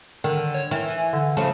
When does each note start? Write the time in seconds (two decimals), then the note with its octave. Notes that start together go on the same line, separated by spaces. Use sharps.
0.24 D3 D#3
0.54 C#5
0.71 D#3 E3
0.90 G#5
1.13 D3
1.37 C#3 F3 A3 A5